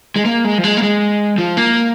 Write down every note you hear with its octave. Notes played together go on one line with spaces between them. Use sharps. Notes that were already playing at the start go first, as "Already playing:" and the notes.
G#3
A#3
G#3
F3
G#3
A#3
G#3
F3
A#3